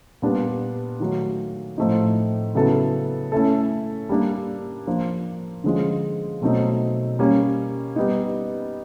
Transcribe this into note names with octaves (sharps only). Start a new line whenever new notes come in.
A#2 G3 B3 D4
D#3 F#3 A3
A2 F3 A3 C4 D#4
C#3 F#3 B3 E4 A4
A3 C#4 E4 A4
G3 A#3 D4
F3 A#3 D4
D3 F3 G#3 C#4 F4
B2 F#3 A3 C4 D#4
G3 A#3 C#4
G3 B3 D#4